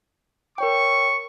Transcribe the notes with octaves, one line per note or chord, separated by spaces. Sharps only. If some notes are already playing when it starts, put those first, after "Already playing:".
A#4 C#5 G5 C#6